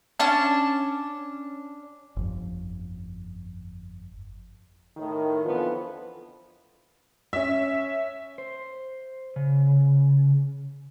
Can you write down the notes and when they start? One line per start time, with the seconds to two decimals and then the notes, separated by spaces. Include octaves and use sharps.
0.20 C#4 D4 A5
2.17 G1 F2
4.97 A2 D#3
5.45 F2 D3 E3 B3 F4
7.33 C#4 E5
8.38 C5
9.36 C#3